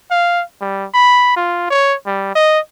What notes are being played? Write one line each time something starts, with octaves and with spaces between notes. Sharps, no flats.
F5
G3
B5
F4
C#5
G3
D#5